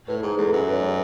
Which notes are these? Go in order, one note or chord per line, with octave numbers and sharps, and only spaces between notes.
A2 B4
G#2 G#4
E2 A4
F#2 B4
B4
C#5